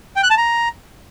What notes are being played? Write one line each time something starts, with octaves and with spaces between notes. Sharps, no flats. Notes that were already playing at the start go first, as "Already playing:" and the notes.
G5
F#6
A5
A#5